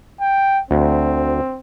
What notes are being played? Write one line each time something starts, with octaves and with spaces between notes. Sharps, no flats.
G5
D2 C4